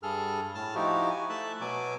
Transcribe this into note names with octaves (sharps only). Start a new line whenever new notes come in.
G2 G#4 A4 F6
A2 A5 F6
F3 D#4 E4 F#4 G4
G#5
A3 E5 A5 F#6
B2 F#3 G#5 D6